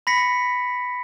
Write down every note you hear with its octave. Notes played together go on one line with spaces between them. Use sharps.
B5 A#6 B6 C#7